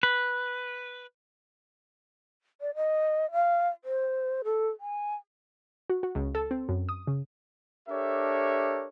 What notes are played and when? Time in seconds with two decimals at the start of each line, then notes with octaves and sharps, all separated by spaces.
0.03 B4
2.61 D5
2.75 D#5
3.32 F5
3.85 C5
4.44 A4
4.80 G#5
5.90 F#4
6.03 F#4
6.15 C#2
6.35 A4
6.51 C4
6.69 F#2
6.89 D#6
7.07 C#3
7.89 D4 G4 A4 A#4 C#5 E5